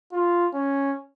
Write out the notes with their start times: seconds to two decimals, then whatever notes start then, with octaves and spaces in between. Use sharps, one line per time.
0.13 F4
0.54 C#4